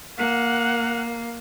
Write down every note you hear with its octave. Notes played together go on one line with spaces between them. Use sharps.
A#3 F#5